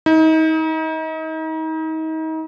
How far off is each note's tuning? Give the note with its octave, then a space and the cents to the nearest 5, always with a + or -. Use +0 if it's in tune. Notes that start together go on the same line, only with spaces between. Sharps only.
D#4 +35